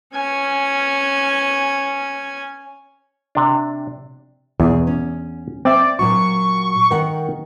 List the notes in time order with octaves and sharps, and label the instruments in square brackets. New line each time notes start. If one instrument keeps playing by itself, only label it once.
[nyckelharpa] C#4 G#5
[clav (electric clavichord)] C3 D4
[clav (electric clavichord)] E2 [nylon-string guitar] B2 G#4
[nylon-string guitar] C#4
[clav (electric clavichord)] C4 E5 [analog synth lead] D5
[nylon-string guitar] A#2 F#3 F#4 [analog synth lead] C#6
[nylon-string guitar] D#3 A#4 F#5